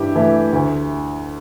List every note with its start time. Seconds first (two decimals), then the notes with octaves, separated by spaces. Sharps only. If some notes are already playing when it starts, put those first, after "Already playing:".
Already playing: G2 E3 E4 G4
0.15 E3 A3
0.53 D2